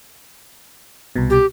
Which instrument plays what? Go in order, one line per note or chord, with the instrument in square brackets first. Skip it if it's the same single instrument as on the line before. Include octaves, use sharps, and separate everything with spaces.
[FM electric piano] C2 B2
[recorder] G4